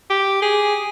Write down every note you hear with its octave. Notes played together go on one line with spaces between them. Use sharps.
G4
G#4